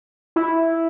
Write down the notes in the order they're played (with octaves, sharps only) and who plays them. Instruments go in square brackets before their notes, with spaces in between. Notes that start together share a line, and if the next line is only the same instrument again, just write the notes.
[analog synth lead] E4